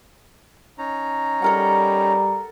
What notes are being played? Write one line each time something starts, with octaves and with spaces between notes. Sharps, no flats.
C#4 D#4 A#5
G3 A4 A#4 F#5